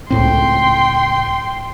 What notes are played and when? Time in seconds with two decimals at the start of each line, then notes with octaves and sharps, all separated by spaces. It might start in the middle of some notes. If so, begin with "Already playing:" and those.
0.10 C#2 A2 C4 G5 C6